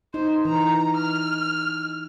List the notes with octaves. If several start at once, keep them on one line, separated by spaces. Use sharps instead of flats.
D#4 C5
E3 A#5
F6